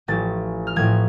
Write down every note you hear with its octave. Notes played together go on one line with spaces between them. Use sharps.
A1 A2 F3 A6
F6
A1 A2 F3 G#6